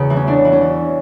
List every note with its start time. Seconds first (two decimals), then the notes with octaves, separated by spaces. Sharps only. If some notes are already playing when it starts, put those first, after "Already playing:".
Already playing: E2 C#3
0.10 E3
0.16 C#4
0.27 E3 D4
0.45 E3
0.52 C#4
0.61 E3